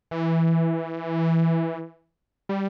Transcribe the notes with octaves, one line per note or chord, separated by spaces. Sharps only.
E3
G3